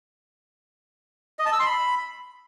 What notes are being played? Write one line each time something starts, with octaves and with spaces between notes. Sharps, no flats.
D#5
A5
E6
C6
B5